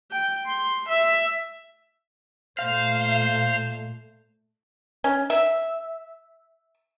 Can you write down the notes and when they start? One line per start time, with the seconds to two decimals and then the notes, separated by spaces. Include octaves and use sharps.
0.11 G5
0.47 C6
0.89 E5
2.59 A#2 A3 C5 F5
5.04 C#4
5.30 E5